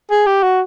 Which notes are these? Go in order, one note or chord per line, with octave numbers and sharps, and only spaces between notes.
G#4
G4
F#4